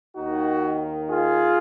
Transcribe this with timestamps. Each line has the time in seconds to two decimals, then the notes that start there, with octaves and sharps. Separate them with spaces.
0.15 D#2 D#3 D#4 F#4
1.09 F4 G#4